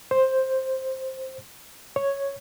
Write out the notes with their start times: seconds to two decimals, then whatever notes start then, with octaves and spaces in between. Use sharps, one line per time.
0.11 C5
1.96 C#5